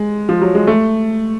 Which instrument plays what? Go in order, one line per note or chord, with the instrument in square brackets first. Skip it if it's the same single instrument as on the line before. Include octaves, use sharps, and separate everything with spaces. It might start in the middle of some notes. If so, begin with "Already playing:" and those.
Already playing: [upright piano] G#3
F3
F#3
G#3
A3